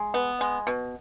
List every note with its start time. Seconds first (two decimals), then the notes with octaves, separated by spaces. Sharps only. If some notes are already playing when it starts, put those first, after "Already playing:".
Already playing: G#3
0.14 B3
0.41 G#3
0.67 B2